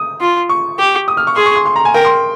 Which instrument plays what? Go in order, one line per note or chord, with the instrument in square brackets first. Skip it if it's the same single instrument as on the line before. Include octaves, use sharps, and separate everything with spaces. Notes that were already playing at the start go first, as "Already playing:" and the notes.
Already playing: [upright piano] D#6
[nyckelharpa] F4
[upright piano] C#6
[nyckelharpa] G4
[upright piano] D#6
F6
C#6
[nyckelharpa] G#4 [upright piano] C6
[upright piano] C#6
C6
C6
A#5
G#5
[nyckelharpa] A#4 [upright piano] G5
[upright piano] C6